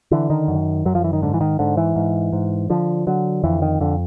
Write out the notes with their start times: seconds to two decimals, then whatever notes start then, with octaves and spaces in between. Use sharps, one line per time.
0.11 D3 E3
0.30 D#3
0.48 F#2
0.85 F#2 F#3
0.95 F3
1.04 E3
1.13 D#3
1.22 G#2 D3
1.34 E3
1.41 D#3
1.59 G#2 D3
1.77 E3
1.96 G#2
2.33 G#2
2.70 D3 F3
3.07 D3 F#3
3.44 F2 E3
3.62 D#3
3.80 F2 D3